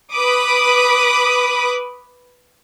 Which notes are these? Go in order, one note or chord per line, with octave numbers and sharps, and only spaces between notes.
B4 B5 D6 D#6